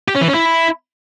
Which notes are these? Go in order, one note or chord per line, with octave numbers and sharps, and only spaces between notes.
G4
C#4
E3
C#4
E4